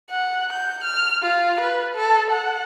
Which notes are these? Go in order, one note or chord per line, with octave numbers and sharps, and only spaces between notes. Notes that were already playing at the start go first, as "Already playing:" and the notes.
F#5
G6
F6
F4
B4
A4
F#5